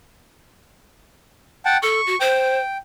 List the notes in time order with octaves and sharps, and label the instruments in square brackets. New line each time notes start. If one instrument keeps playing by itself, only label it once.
[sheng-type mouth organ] F#5 G5 A5
[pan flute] A4 [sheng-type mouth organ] C#6
[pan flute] F#4
[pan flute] C5 [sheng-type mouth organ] G5